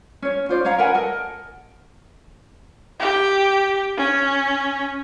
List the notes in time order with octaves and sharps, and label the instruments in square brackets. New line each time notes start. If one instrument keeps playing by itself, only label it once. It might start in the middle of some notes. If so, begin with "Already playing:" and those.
[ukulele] C#4 C#5
F4 C5 D5
C#4 C#5 F5 A#5
A#4 B4 F#5 G#5
A4 A#4 D#5
[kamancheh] G4
C#4